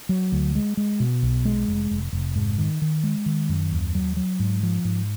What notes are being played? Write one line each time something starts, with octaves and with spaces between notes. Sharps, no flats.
F#3
D2
G#3
G#3
B2
B1
G#3
F1
F1
F1
G#2
D#3
D#3
G#3
D#3
F#2
D#2
F#3
F#3
G#2
F3
G#2